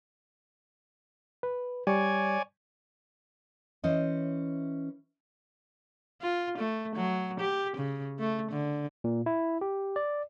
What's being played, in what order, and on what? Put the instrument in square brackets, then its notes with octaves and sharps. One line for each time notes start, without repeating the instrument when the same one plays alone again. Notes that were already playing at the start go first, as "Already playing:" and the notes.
[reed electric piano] B4
[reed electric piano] G3 C#6 [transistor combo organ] C#5 D5 G#5
[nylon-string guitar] E3 C#4 C5 D#5
[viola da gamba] F4
A3
F#3
G4
C#3
A3
D3
[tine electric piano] A#2
E4
G4
D5